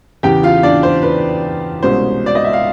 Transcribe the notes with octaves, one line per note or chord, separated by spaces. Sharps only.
E2 C#3 E3 G4 G5
F4 F5
D4 D5
C5
B4
C2 B2 G#3 C#4 C5
D5
D#5
E5
F5